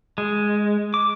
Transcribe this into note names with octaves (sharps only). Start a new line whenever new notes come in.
G#3
D6